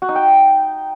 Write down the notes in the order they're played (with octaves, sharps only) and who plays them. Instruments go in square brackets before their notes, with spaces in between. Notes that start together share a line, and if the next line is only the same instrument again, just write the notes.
[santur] F#4
D#4
G5